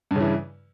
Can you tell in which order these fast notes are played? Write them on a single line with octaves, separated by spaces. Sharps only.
G2 C#3 E3